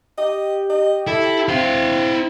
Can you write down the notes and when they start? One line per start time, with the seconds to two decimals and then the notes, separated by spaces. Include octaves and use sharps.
0.18 G4 D#5
0.69 D#5
1.07 E4 A4
1.48 C4 E4 F5